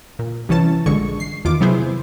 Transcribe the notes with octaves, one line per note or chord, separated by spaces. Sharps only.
A#2
C2 E3 C#4 A5
A#1 G2 D3 G#3 C#6
C7
E2 D#3 F4 D6
C3 F#3 B3 E4 G#4 C5